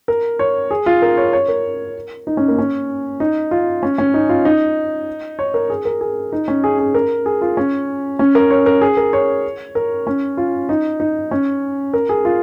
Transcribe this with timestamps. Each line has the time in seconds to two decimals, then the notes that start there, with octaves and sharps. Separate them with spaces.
0.08 A#4
0.39 C#5
0.71 G#4
0.86 F4
1.02 A#4
1.17 C#5
1.33 C#5
1.48 A#4
2.27 D#4
2.37 C#4
2.48 A#3
2.59 C#4
3.20 D#4
3.51 F4
3.83 C#4
3.98 C#4
4.14 D#4
4.29 F4
4.45 D#4
5.39 C#5
5.54 A#4
5.70 G#4
5.85 A#4
6.01 G#4
6.32 D#4
6.48 C#4
6.64 G#4
6.79 G#4
6.95 A#4
7.26 G#4
7.41 F4
7.57 C#4
8.19 C#4
8.35 A#4
8.51 C#5
8.66 A#4
8.81 G#4
8.97 A#4
9.13 C#5
9.75 A#4
10.07 C#4
10.37 F4
10.69 D#4
11.00 D#4
11.31 C#4
11.94 A#4
12.09 G#4
12.25 F4